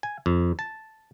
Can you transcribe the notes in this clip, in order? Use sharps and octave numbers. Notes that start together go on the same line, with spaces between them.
G#5
F2
A5